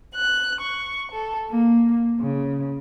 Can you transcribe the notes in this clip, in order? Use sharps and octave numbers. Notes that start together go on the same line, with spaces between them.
F#6
C#6
A4
A#3
C#3